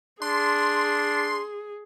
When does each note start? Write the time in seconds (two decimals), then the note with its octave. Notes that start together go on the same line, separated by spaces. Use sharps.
0.22 D4 G#4 C6